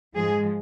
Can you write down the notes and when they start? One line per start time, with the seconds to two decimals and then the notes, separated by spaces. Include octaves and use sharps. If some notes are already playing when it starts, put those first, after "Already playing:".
0.16 G#2 F3 G#3 G#4